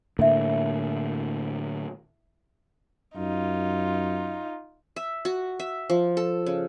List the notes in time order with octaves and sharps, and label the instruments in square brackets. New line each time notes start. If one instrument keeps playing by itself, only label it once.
[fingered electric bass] A2 D3 A#3 [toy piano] E4 E5
[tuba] F#2 [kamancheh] D#4 F4
[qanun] E5
F#4
E5
F3
A4
C#3